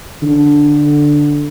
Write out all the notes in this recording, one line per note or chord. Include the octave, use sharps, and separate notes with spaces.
D3